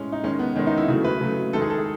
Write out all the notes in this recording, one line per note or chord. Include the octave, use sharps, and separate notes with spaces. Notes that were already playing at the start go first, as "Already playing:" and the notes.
Already playing: A2 G#3 C#4
D#4
D#3 G#3 C#4
B3
D#3 G#3 C#4
D#4
E4
C#3 F#3 A3
B4
C#3 F#3 A3
D#3 G#3 A4
G#4
A4
G#4